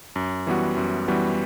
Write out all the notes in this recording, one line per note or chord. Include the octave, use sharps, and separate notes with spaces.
F#2
E3 G3 B3 F#4
F#2
E3 G3 B3 F#4